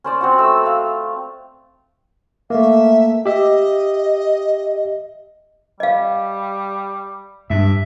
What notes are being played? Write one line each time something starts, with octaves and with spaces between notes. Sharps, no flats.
C#4 C5 D5
C4 F#4 F#5
A3 E6
F5
A3 A#3 E5
G4 D#5 E5
G3 D#5 F5
G2 E5